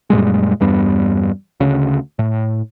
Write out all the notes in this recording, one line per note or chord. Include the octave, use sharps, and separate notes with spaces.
F#2 A#2 G3 G#3
E2 G2 G3 B3
D2 C#3
A2